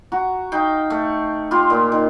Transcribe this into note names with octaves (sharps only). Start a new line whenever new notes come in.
F#4 A#5
D#4 F5 G5
A3
F4 G4 C6
A#2
D#3